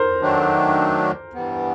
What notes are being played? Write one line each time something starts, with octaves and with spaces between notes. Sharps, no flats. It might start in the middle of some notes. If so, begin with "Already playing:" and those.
Already playing: A#4 C5
D#3 F#3 A3 D4
G2 E3 G3 B3